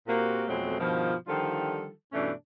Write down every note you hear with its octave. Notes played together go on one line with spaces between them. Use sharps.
A#2 A#3 C4 F#4 G4
F2 B2 F#3 G#3 A3 C4
G2 B2 D#3 F3
D3 D#3 F3 G3 F4 A4
G2 B2 E3 A3 C#4 D4